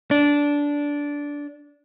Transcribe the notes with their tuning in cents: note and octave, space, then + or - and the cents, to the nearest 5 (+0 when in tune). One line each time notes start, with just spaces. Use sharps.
D4 -15